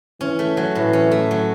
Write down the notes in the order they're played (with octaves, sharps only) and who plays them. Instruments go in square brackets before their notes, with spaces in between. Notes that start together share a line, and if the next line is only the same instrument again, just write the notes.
[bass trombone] E3 [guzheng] C#4
[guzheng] A3
F#3
[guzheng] A2 [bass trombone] E3
[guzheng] C#4
A3
F#3